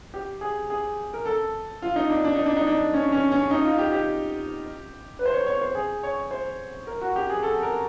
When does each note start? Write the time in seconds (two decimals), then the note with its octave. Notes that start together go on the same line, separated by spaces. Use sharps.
0.14 G4
0.41 G#4
0.70 G#4
1.14 A#4
1.26 A4
1.82 F4
1.96 D#4
2.09 D4
2.24 D4
2.35 D#4
2.46 D4
2.57 D#4
2.67 D4
2.94 C#4
3.12 C#4
3.32 C#4
3.51 D#4
3.64 F4
3.78 G4
3.92 G4
5.19 B4
5.26 C5
5.33 C#5
5.46 C#5
5.61 C5
5.75 G#4
6.03 C#5
6.31 C5
6.87 A#4
7.01 F#4
7.16 G4
7.30 G#4
7.43 A4
7.62 A#4